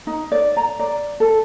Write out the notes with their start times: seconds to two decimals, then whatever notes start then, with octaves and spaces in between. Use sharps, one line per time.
0.07 D#4
0.32 D5
0.57 A#5
0.79 D5
1.20 A4